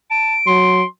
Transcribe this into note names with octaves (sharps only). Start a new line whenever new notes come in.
A5 D7
F#3 C6